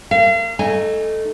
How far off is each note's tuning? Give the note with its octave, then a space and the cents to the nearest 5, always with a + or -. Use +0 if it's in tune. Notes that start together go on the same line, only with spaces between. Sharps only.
A#3 -30 F5 -40
A3 +0 D#4 -15 G#5 -10